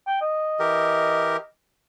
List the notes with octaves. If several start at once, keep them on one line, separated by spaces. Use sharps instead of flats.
G5
D#5
E3 G4 A#4